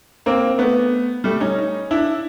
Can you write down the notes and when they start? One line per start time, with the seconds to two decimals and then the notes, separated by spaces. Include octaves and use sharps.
0.26 A#3 C4
0.58 A3 B3
1.24 G3 A3
1.40 C#4 D#4
1.91 D4 E4